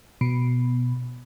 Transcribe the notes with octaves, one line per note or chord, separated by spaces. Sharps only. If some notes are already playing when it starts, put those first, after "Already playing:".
B2